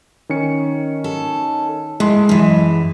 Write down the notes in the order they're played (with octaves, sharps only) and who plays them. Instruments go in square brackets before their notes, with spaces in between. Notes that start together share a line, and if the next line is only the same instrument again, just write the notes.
[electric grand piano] D#3 C#4 C#7
[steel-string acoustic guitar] A4
[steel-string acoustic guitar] A2 [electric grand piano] G#3 C6
[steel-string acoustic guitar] F#2 E3